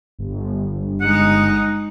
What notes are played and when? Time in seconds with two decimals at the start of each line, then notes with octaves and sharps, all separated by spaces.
0.19 G1
1.01 G#3 D#4 F#5